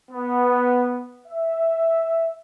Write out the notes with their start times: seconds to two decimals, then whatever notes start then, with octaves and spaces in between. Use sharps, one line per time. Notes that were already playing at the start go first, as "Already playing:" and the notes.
0.11 B3
1.28 E5